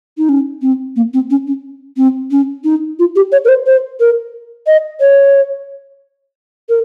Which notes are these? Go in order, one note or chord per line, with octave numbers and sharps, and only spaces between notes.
D#4
C#4
C4
A#3
C4
C#4
C#4
C4
C#4
D#4
F4
G4
C#5
A#4
C5
C5
A#4
D#5
C#5
A#4